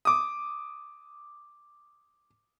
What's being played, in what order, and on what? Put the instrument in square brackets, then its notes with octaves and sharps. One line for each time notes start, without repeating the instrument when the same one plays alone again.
[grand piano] D6 D#6